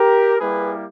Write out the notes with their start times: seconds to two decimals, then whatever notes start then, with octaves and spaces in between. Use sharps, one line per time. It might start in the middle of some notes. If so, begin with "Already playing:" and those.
Already playing: G4 A#4
0.40 G3 A#3 E4 G4 G#4 B4